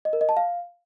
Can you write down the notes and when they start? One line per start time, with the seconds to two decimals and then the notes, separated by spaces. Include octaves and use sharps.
0.05 D#5
0.13 A#4
0.21 D#5
0.29 A5
0.37 F5